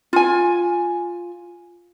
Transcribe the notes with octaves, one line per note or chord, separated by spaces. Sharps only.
F4 G#5